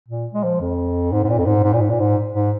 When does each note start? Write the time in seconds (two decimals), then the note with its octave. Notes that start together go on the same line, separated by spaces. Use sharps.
0.08 A#2
0.34 G#3
0.43 F3
0.60 F2
1.12 G#2
1.24 G#2
1.29 A#2
1.38 F2
1.46 G#2
1.63 G#2
1.73 A#2
1.81 G#2
1.90 A#2
1.99 G#2
2.33 G#2